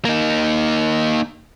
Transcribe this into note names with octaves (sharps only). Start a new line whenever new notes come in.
A#3 D#4